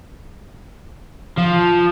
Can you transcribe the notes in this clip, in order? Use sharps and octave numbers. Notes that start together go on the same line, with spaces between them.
F3